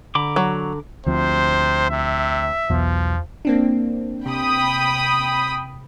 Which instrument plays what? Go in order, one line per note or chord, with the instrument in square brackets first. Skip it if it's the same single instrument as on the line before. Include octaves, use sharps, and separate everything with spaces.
[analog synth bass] D3 [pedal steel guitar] A#5 B5 D6
[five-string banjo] F#3
[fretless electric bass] D2 F3 C4 [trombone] C3 [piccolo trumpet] C5
[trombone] C3 [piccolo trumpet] E5
[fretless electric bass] B1 B2 [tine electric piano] E2 [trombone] F3
[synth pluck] A#3 C4 D4
[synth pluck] C3 [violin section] G5 B5 D#6